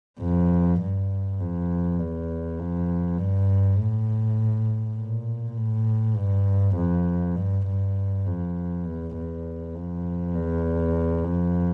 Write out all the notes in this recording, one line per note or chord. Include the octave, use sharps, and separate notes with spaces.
F2
G2
F2
E2
F2
G2
A2
A#2
A2
G2
F2
G2
G2
F2
E2
E2
F2
E2
F2